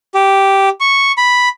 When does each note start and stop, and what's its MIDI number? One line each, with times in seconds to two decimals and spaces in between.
0.15 0.69 67
0.80 1.12 85
1.17 1.49 83